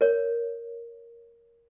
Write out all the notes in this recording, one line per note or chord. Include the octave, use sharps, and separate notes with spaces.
A#4 C#5